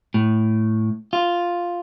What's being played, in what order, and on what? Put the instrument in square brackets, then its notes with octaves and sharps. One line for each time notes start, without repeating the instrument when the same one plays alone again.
[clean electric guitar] A2
F4